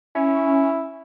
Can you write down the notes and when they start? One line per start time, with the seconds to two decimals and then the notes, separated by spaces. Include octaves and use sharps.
0.15 C#4 E4